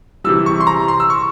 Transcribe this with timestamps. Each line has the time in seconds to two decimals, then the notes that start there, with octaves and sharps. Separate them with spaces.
0.24 C3 E3 G3 E6
0.46 C#6
0.61 C6
0.67 A#5
0.88 C6
1.00 E6
1.10 C#6